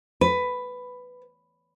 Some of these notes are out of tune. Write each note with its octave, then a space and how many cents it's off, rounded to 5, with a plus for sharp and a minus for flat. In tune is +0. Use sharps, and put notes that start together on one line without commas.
B4 +10